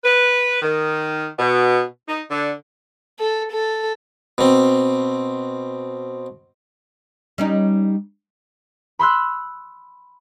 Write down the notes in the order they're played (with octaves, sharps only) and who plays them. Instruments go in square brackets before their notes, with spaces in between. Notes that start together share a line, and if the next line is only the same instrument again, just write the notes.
[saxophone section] B4
D#3
B2
D#4
D3
[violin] A4
A4
[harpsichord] B2 C4
[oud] G3 C#4 D#4
[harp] B5 C6 E6 F#6